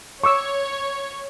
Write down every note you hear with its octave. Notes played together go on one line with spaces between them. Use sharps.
C#5 C#6 D6 E6